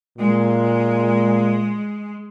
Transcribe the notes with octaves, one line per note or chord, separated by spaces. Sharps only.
A#2 G#3